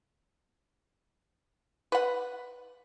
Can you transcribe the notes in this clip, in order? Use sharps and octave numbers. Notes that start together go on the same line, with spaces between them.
B4 F#5